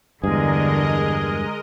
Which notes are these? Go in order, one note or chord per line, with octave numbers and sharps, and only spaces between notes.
E2 G2 D3 G#3 G#4 A#4 D#5